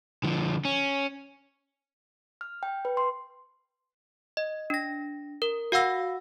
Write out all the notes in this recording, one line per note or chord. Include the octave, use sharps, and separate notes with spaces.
D3 F3
C#4
F6
G5
B4
C6
D#5
D4 A#6
A#4
F#4 F5 F#5 E6 A#6